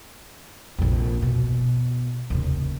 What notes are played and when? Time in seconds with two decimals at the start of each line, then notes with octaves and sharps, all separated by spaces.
0.79 A#1 F2
1.22 B2
2.30 D#2 C#3